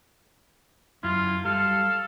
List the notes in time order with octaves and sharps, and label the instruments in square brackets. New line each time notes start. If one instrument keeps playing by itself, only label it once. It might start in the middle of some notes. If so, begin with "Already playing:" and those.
[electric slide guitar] F#2 E4 [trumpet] F4
[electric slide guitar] G3 [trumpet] A4 [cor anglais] F5